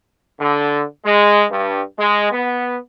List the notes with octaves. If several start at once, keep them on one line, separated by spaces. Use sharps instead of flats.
D3
G#3
G2
G#3
B3